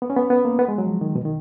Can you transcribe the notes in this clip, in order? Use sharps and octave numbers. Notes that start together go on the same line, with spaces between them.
B3
C#4
B3
B3
A#3
B3
G#3
F#3
F3
D#3
B2
D#3